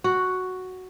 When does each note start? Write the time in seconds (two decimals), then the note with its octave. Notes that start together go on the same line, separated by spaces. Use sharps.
0.04 F#4